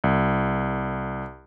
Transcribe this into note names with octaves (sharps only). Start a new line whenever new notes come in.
C2